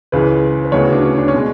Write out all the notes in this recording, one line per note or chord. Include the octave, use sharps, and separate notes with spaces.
C#2 C#3 E3 B4
B4
D2 C#3 E3 B3 C#5
F#4
D4
C#4
D4
C#4
B2 G#3